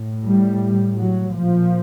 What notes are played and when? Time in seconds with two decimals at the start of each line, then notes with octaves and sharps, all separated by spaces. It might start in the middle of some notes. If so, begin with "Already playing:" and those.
Already playing: A2
0.25 G3
0.98 F#3
1.34 A#2 F3